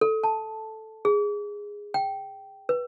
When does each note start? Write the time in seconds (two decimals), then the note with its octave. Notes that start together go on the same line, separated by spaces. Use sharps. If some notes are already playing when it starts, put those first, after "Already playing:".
0.01 A4
0.24 A5
1.05 G#4
1.94 G5
2.69 B4